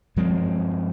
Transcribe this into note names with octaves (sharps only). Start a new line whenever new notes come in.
G2 F3 G#3 C4